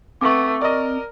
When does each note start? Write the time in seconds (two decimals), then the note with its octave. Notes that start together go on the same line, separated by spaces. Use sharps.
0.21 A3 B3 C4 C#6 D6
0.61 A#4 D5 D#5